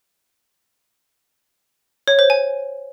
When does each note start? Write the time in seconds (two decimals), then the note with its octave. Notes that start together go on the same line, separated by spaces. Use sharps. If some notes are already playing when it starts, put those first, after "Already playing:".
2.08 C#5
2.19 C5
2.30 G#5